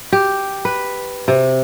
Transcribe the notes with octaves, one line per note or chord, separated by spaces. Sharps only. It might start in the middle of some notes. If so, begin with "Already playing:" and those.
G4
B4
C3